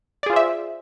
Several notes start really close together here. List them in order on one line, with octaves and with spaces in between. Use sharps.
D5 G#4 F4 C5 E5